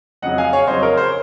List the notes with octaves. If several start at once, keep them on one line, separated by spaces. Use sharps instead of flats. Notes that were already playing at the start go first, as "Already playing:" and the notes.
F2 C#3 F#3 D#5 F#5
F5 G#5
C#5 F5
F2 C#3 F#3 C5 D#5
A#4 C#5
C5